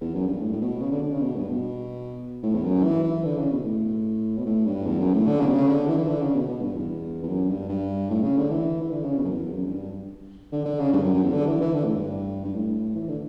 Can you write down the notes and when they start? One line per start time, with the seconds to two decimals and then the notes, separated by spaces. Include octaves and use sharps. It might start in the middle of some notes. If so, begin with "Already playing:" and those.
0.01 E2
0.14 F#2
0.27 G2
0.41 A2
0.53 A2
0.61 B2
0.81 C#3
0.92 D3
1.02 D3
1.12 C#3
1.21 B2
1.36 G2
1.49 B2
2.43 A2
2.55 E2
2.64 F#2
2.84 E3
3.04 E3
3.25 D3
3.38 C#3
3.52 B2
3.64 A2
4.38 B2
4.46 A2
4.66 G2
4.86 E2
4.99 F#2
5.13 A2
5.27 D3
5.40 C#3
5.46 B2
5.53 C#3
5.67 D3
5.87 E3
5.98 E3
6.07 D3
6.21 C#3
6.34 B2
6.48 B2
6.61 G2
6.75 E2
7.23 E2
7.28 F#2
7.49 G2
7.69 G2
8.10 A2
8.23 C#3
8.37 D3
8.50 E3
8.82 E3
8.91 D3
9.04 C#3
9.18 B2
9.24 F#2
9.31 E2
9.51 F#2
9.67 F#2
9.71 G2
10.52 D3
10.65 D3
10.80 C#3
10.93 G2
11.03 F#2
11.14 F#2
11.23 E2
11.33 D3
11.47 E3
11.61 E3
11.73 D3
11.84 A2
11.94 G2
12.44 G2
12.55 A2
12.95 E3
13.08 D3